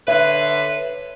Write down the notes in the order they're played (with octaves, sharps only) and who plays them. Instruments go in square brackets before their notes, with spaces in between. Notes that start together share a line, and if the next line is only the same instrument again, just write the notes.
[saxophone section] D3 B4 [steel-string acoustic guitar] C#5 E5